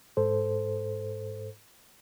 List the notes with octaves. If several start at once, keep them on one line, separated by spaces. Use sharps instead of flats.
G#2 A4 C5